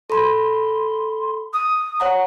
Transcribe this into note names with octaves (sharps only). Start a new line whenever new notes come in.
A4 B5 C6
D#6
C#5 F#5 A#5